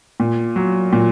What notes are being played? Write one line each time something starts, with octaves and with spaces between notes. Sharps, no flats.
A#2
F#3
A#2